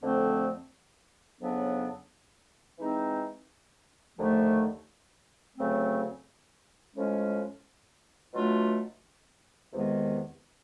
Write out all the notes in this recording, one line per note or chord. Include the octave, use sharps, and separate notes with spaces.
F2 D3 F3 A3 C4
F2 C#3 F#3 B3 D4
E3 G#3 C4 D#4
D#2 D3 F3 A3
D2 C#3 F#3 A3 C4
A2 F3 G#3 C#4
B2 F#3 A3 D4 F4
E2 C3 D#3 G#3 B3